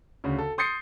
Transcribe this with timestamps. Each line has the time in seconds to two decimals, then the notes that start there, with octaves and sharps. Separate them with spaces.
0.24 D2 C#3
0.38 A4
0.58 C6 D#6 G6 A6 C7 C#7